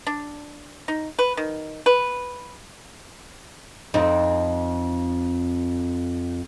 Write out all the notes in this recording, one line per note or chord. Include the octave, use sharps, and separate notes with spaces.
D4
D#4
B4
D#3
B4
F2 C4 D#4